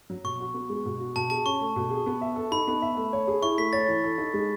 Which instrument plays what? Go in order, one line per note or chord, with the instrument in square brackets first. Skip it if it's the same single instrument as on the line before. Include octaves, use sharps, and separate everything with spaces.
[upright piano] F#3
[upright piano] B2 [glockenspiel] C#6
[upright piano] F#4
B3
G#3
B2
F#4
[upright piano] B2 [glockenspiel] A5
[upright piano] G#4 [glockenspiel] A5
[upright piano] C#4 [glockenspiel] C#6
[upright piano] A3
B2
G#4
B3
E5
A4
[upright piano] D#4 [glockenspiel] B5
[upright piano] B3
E5
A3
C#5
G#4
[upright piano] E4 [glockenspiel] C#6
[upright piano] A3 [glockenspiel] B6
[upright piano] C#5 [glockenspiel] A6
[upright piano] E3
A4
D#4
G#3